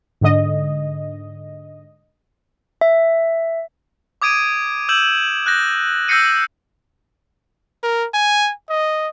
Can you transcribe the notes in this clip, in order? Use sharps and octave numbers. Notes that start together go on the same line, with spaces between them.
G#2 D3 D#5
E5
D6 D#6 G#6 D7 D#7
E6 G6 E7 F#7
F#6 G6 A#6
E6 G6 A#6 C7 C#7 D#7
A#4
G#5
D#5